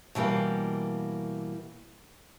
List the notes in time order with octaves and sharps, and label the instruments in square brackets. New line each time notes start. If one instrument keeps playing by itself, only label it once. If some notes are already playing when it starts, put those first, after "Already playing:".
[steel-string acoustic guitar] B2 E3 G3 A#3